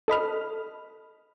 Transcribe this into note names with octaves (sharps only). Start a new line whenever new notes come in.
A4 D#5 B5 F6